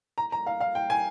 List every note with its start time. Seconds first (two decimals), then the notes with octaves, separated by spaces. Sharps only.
0.18 A#5
0.32 A#5
0.46 F5
0.60 F5
0.75 G5
0.90 G#5